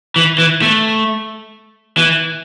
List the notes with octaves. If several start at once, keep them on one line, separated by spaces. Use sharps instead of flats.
E3
E3
A3
E3